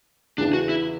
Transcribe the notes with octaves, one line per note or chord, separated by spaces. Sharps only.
E2 C#3 E3 D4
F#4
E4